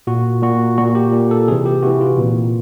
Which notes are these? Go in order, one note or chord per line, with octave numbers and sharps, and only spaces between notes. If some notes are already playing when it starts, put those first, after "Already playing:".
A#2 F#4
A#2 F#4
A#2 F#4
G4
A#2
A4
C3 E3 G#4
G4
C3 E3 F#4
F4
A#2